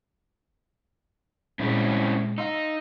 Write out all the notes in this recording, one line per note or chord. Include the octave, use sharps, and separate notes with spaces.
A#2 G#3 C4 C#4 E4
D#4 F5 C6 E6